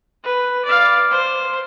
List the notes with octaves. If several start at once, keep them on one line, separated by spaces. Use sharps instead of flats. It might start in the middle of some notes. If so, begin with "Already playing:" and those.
B4
D5 F5
C5